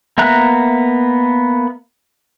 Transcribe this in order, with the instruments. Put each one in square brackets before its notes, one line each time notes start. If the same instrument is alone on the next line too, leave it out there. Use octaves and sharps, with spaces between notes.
[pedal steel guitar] A#3 B3 E5 A#5 F#6